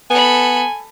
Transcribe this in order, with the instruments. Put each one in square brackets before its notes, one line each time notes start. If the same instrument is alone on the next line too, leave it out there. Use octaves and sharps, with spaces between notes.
[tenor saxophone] B3 [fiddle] A4 B5 [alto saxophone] G#5